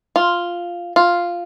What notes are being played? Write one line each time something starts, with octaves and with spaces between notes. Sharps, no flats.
F4
F4